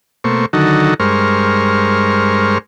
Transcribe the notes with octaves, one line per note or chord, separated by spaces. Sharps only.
B2 A3 A#3 C5 C#6
D3 D#3 F#3 D#4 F#4 A4
G2 G#3 A#4 C5 C#6 F6